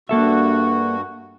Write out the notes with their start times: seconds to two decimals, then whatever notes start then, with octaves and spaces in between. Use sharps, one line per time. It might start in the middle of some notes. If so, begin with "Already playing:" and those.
0.09 G2 A#3 F#4 A4 E5